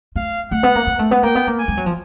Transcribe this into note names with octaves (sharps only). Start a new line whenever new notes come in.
A3 F5
A3 F#5
B3
A#3
A#3
A3
B3
A#3 G5
B3
A#3
G#5
G#3
F#3
F3